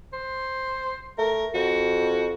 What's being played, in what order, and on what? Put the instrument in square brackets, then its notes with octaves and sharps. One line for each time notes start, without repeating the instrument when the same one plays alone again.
[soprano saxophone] C5
[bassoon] A3 [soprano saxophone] A#4
[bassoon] F2 [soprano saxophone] F#4